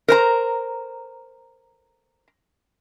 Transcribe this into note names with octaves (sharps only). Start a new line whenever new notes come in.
A#4 C5 A#5